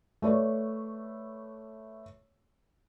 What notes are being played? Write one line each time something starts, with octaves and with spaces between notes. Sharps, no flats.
A3 B4 C#5 D5